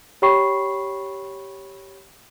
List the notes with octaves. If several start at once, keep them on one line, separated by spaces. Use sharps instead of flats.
G4 C#5 G5 B5 C#6 C7